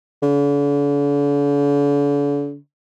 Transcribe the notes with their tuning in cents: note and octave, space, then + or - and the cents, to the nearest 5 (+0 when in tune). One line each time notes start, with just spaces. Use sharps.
D3 -45